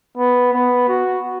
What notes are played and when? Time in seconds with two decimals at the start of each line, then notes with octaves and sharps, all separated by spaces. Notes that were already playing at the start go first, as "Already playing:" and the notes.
0.17 B3
0.53 B3
0.89 F#4